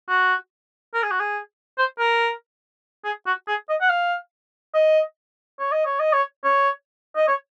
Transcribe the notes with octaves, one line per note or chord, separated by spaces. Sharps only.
F#4
A#4
G#4
F#4
G#4
C5
A#4
G#4
F#4
G#4
D#5
F#5
F5
D#5
C#5
D#5
C#5
D#5
C#5
C#5
D#5
C#5